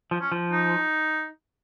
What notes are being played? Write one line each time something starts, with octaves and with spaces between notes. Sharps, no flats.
F3
C#4
F3
D#4